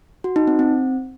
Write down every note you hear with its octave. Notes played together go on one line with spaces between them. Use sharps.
F#4
D#4
C4
C4